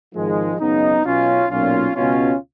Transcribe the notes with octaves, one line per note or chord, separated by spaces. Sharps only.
G#1 G#2 D#3 F3 G#3
G#1 F#2 C#3 B3 D#4
B1 B2 C#4 F4
B1 A#2 C#4 F4
C#2 B2 C#4 F4